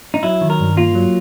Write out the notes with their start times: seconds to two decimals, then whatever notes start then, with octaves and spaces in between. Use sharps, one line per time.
0.14 D#4
0.23 F#3 E4
0.41 D#3
0.50 A#4
0.59 G2
0.77 A#3 F4
0.95 F#3